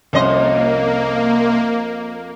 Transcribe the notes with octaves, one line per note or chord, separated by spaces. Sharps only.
C2 F2 A#3 C#4 D#5 C6